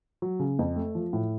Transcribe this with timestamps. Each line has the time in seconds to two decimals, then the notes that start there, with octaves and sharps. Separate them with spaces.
0.22 F#3
0.39 C#3
0.59 F2
0.76 A3
0.95 F3
1.13 A2